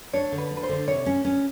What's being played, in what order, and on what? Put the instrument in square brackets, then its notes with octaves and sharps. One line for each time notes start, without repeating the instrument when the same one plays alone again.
[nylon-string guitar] D4 [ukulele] C#5
[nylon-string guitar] D3
[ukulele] B4
[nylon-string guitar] D4
[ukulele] B4
C5
[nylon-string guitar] D3
[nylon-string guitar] C3 [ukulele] C#5
[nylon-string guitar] C#4
C#4